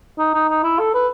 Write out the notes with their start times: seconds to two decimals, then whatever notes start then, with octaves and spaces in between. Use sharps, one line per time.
0.18 D#4
0.34 D#4
0.48 D#4
0.63 E4
0.79 A4
0.94 B4